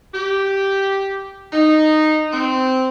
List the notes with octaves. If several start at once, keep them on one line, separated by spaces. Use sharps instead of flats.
G4
D#4
C4